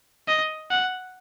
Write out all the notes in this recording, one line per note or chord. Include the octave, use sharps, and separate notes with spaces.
D#5
F#5